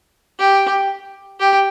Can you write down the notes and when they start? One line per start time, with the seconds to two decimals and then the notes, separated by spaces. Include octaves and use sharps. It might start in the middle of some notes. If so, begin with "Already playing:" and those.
0.39 G4
1.40 G4